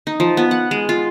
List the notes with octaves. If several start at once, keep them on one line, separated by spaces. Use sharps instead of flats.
D#4
F3
B3
F#5
G#3
F4